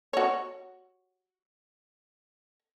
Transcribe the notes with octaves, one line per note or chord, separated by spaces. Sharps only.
F#4 C#5